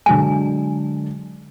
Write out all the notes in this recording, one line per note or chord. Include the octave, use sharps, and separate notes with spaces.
D3 F#3 G#3 G#5